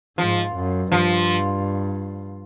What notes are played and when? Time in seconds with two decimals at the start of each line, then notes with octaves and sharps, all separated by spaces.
0.18 G#2 F3
0.55 F#2
0.92 G2 F3